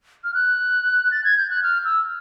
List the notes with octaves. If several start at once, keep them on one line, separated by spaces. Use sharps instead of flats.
F6
F#6
A6
G#6
G6
F#6
F6
E6